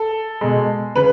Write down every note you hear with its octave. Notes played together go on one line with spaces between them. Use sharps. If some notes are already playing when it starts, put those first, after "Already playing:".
Already playing: A4
B2 G#3
C#3 B4